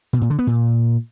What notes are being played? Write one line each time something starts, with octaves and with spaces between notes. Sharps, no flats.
B2
A#2
D3
B3
A#2